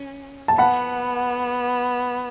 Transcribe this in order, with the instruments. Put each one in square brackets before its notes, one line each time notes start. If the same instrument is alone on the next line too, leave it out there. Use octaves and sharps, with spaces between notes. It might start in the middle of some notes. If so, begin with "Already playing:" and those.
Already playing: [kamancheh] C#4
[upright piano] A5
[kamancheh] B3 [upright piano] F#5 B5